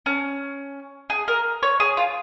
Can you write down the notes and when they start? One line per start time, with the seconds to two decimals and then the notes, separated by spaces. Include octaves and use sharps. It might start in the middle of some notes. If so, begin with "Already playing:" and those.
0.06 C#4
1.10 G#4
1.28 A#4
1.63 C#5
1.80 G#4
1.97 F4